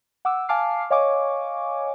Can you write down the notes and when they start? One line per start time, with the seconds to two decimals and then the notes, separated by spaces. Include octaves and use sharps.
0.25 F#5 D6 E6
0.49 F5 G#5 A5 D6 F6 C7
0.90 C#5 D#5 F5 G#5 C#6 D6